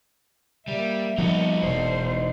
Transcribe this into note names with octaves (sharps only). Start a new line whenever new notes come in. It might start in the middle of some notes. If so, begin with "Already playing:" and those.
G3 A#3 E5
F3 G3 B3 D#4 F#4
E1 C5